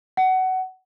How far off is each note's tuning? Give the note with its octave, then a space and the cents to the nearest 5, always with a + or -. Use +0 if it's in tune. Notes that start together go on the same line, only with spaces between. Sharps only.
F#5 +20